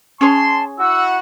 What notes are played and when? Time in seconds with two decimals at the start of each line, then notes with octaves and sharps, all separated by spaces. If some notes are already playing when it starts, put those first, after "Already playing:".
0.21 C#4 G#4 C#5 A5 C6
0.79 E4 F#4 F#5 E6